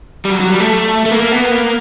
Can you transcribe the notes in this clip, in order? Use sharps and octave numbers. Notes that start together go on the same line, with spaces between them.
G3
F#3
F#3
G3
A3
A3
A#3
B3
A#3